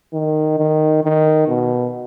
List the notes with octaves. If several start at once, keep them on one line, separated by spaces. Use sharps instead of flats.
D#3
D#3
D#3
B2